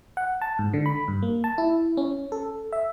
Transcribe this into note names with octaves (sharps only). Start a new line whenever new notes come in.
F#5
A5
G#2
D3
B5
G2
A#3
A5
E4
C#4
A4
E5